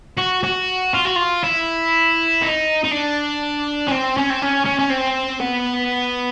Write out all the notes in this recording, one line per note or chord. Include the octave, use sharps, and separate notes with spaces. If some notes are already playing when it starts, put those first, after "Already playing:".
F#4
F#4
F4
F#4
F4
E4
D#4
D#4
D4
C#4
C4
C#4
C4
C#4
C#4
C#4
C4
B3